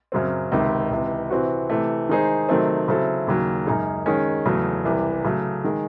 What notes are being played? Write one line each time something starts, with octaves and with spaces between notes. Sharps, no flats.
F#2 C#3 F#3 C4
C#2 C3 D#3
C#2 C3 E3
C3 E3 C4 F#4
C3 E3 A3
D#3 G#3 D#4 G#4 C5
C3 D#3 F#3 A3 C4
C#3 F#3 C4 E4 A4
D#2 C#3 F#3
F#2 C#3 G#3 D#4 G#4
D#3 G#3 C#4
E2 C#3 F#3 A3
C2 C3 E3
C#3 F#3 A3
D#3 G#3